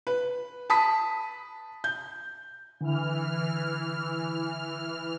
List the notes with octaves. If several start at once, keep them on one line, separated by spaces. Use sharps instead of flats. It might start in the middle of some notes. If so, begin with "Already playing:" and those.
B4
A5 B5 D#6 B6
G6
D3 E3 F6